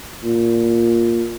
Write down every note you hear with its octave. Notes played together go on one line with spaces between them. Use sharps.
A#2